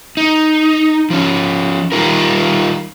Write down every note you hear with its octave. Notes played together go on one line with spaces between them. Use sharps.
D#4
F3 C#4
D#3 G3 A3 D#4 F4 A#4